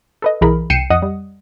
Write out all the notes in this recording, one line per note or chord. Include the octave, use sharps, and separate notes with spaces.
A4 B4 D#5
B1 E3 G#4 A#4 B5
C2 G5 C7 C#7 D#7 E7
F2 D#5 F#5 D#6
G3